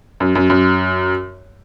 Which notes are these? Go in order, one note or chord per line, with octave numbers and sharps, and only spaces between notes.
F#2
F#2
F#2